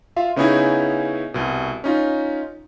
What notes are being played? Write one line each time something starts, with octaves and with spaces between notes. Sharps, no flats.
F4 E5 F5
C#3 B3 C#4 D#4 E4 G#4
C2 B2
C#4 D#4 F4